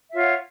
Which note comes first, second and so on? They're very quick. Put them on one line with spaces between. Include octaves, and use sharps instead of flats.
E5 F4 C#5 F#5